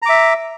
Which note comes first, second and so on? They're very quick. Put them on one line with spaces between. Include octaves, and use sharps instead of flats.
A#5 D6 E5